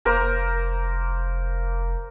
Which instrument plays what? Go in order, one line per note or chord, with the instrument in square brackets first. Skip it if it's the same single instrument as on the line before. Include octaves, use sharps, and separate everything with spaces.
[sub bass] F1 [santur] A#3 A#4 C5